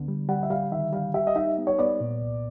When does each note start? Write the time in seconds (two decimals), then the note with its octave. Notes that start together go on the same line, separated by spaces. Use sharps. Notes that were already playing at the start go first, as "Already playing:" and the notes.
Already playing: D2 D3 B3
0.08 G3
0.28 G3 F#5
0.43 E5
0.50 G3 F5
0.72 D#3 E5
0.93 G3 F5
1.14 G4 E5
1.27 D#5
1.36 D#4 E5
1.58 B3
1.67 C#5
1.79 B3 D5
2.00 A#2
2.22 C2